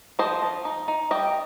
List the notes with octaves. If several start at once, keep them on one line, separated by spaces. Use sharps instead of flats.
F3 C5 D#5
F3
D#4
D#4
G3 D#5 G5